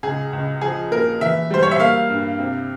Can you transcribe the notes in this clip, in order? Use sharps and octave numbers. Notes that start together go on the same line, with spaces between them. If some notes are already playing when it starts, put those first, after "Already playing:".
C#2 G#4
C#2
F3 G#4
A#3 A#4
E3 E5
G3 C5
C#5
E5
A#3 F5
G2
C3